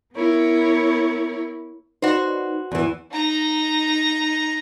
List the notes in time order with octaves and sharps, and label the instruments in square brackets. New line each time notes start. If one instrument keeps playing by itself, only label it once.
[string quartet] B3 E4 A#4 C#5
[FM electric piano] D#4 B4 D5 [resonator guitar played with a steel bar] F#4 C5
[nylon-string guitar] E2 E3
[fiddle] D#4 A#5